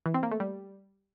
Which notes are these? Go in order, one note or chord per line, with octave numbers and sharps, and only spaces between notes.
E3
C4
A#3
A3
G3